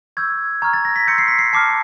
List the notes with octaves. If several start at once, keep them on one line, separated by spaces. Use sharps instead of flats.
C#6 E6 G6 G#6
A#5 C#6 F6 G#6
A6
A#6
B6
C6 E6 G6 C#7
C7
B6
C7
A5 D6 F6 C7